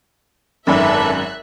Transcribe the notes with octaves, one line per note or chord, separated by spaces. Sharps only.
G#1 F#2 D4 A4 B4 E5 F#6